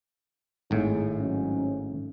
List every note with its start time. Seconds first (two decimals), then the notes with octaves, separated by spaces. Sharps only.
0.71 G#1 A2 G#3 D#4
1.19 G#2 F#3 C#4